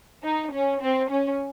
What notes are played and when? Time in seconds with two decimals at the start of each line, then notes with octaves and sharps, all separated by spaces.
0.23 D#4
0.52 C#4
0.81 C4
1.10 C#4